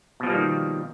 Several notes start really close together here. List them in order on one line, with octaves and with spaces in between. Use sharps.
B2 F3 G3 A#3 D#3